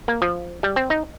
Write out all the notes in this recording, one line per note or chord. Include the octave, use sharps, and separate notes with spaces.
A#3
F3
G3
C4
D#4